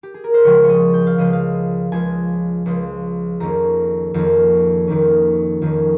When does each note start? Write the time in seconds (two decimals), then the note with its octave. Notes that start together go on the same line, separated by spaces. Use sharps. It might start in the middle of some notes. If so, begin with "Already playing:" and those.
0.03 G4
0.14 G#4
0.24 A#4
0.34 C5
0.44 C#2 C#3 F3 G#3 C#5
0.64 C#5
0.69 D#5
0.93 G5
1.07 F5
1.18 C#2 C#3 F3 G#3 D#5
1.33 F5
1.92 C#2 C#3 F3 G#3 G#5
2.66 C#2 C#3 F3 G#3
3.40 F2 D#3 A#3 C#4 A#5
4.14 F2 D#3 A#3 C#4
4.87 F2 D#3 A#3 C#4
5.62 F2 D#3 A#3 C#4